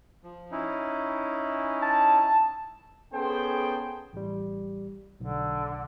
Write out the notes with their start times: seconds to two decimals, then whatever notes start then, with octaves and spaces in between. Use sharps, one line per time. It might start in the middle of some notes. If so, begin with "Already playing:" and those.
0.23 F3
0.51 C#4 D#4 E4
1.82 A5
3.13 B3 C#4 G#4 A4 C5 G5
4.13 A1 G3
5.21 B1 D3